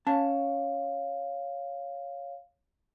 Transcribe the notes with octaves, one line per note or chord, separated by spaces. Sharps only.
C#4 C#5 F5 A5